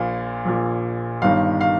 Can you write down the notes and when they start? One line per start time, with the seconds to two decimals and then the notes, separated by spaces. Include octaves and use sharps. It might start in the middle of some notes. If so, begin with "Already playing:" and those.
Already playing: A#1 A#2 F5
0.45 A#1 A#2
1.22 G1 G2 D#3 F5
1.61 F5